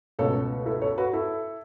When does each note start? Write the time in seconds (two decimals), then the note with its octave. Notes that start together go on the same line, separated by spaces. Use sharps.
0.19 C#2 B2 A3 A4 C#5
0.66 E4 A4
0.82 A4 C#5
0.98 F#4 B4
1.13 E4 A4